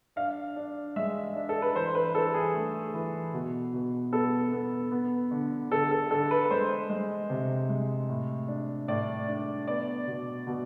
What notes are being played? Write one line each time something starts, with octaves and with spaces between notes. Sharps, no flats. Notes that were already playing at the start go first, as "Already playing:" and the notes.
D4 F5
D4
G#3 E5
D4
A4
B4
E3 C5
B4
E3 A4
G#4
A3
E3
B2
B2
B3 A4
B3
B3
D3
D3 A4
A4
D3 A4
B4
G#3 C5
G#3
C3
G#3
A2
D4
A2 D5
D4
B3 D5
B2
B2